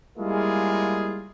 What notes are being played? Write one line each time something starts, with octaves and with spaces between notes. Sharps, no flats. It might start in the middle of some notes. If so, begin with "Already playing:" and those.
G3 G#3 A#3 E4 F4 G#4